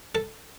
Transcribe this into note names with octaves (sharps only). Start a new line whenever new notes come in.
A4